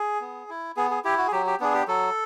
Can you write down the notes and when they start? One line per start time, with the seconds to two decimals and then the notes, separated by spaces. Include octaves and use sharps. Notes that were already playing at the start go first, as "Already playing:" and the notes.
Already playing: G#4
0.21 B3
0.49 E4
0.77 B3 G#4
0.90 G#4
1.05 E4 G4
1.18 F#4
1.27 G#4
1.32 F#3 G4
1.46 G4
1.60 B3 D4 G#4
1.74 G4
1.88 F#3 A4